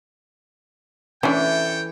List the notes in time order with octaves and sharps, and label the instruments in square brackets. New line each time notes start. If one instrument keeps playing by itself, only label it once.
[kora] E3 [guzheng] A3 [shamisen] C#4 D4 [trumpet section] A4 C#5 G5